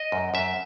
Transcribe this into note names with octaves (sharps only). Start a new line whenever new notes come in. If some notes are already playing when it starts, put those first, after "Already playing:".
Already playing: D#5
F#2
F#2 E5